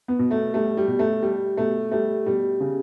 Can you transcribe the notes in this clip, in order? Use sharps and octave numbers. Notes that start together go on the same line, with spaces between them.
B3
B2
A3
G3 A3
G3
B2
A3
G3
B2 A3
G3 A3
B2 G3
C#3